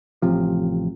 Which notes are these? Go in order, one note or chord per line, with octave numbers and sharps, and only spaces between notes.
A1 C3 F3